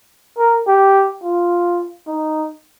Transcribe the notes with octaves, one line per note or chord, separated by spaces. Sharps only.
A#4
G4
F4
D#4